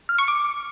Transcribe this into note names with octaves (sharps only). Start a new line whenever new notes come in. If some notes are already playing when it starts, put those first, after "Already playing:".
F6
C#6
D6